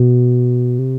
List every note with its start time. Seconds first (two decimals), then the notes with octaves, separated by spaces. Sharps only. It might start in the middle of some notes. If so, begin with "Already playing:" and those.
Already playing: B2
0.79 C3